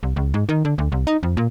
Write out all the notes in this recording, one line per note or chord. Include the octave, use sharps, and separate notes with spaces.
C2
C#2
G#2
D#3
D3
D2
C2
D#4
F2
A#2